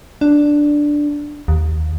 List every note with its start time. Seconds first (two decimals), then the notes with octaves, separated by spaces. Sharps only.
0.21 D4
1.48 D#2